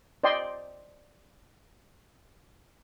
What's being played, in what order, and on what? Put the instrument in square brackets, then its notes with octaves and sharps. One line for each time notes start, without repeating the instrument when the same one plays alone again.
[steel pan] C5 D5 D#5 G5 C6